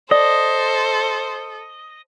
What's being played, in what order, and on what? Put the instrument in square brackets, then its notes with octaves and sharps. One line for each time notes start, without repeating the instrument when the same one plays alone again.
[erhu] A4 [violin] C5 [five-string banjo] D5 [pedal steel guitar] D#5